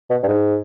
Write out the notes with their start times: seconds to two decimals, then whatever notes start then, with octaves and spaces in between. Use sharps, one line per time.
0.10 B2
0.23 G2
0.28 G#2